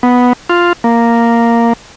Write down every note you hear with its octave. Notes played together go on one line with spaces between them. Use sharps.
B3
F4
A#3